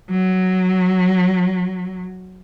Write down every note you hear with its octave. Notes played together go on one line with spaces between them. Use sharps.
F#3